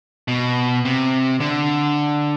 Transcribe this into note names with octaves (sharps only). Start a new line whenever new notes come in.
B2
C3
D3